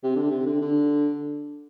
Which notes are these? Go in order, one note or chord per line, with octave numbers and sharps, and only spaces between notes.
C3
D3
C3
D3
D3